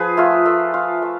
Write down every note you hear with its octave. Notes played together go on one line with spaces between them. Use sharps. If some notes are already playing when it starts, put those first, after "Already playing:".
Already playing: F3 G#4 B4
A3 F4
A3
F4
A3